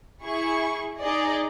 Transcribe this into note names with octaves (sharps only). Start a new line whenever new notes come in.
E4 G#4 C#6
D#4 G#4 D5 D#5